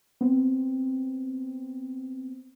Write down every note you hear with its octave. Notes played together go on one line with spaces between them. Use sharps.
B3 C4